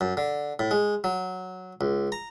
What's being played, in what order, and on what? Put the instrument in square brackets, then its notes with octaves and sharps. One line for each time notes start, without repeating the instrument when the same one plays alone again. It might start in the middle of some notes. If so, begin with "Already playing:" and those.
[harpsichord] F#2
D3
A2
G#3
F#3
C#2
A#5